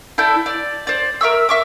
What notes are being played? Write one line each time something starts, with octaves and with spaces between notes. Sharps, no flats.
E4 A4 D5 G6
D5
C5 D5
A#4 E5 C#6 E6
E5 C#6 D6